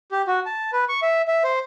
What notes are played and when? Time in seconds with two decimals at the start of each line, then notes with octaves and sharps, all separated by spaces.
0.12 G4
0.28 F#4
0.46 A5
0.73 B4
0.89 C#6
1.02 E5
1.28 E5
1.44 C5